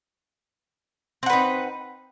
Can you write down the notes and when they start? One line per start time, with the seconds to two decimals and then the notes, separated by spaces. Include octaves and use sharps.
1.23 C4
1.26 F#5
1.30 B4
1.33 D#4